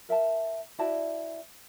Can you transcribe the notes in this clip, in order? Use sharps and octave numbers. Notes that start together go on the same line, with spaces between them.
A#4 E5 G5 A5
E4 F#4 D5 A5